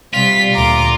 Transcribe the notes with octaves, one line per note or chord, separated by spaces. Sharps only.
C3 G3 F4 B6
D2 A#2 A#5 D6